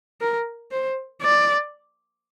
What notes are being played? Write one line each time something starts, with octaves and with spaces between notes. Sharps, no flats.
A#4
C5
D5